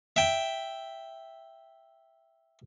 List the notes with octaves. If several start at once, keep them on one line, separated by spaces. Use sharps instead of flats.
E5 G5